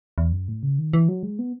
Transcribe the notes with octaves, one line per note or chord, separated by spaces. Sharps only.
E2
F#2
A2
C#3
D#3
E3
F#3
G#3
B3